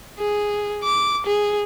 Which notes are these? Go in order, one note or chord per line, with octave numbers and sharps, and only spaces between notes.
G#4
D6
G#4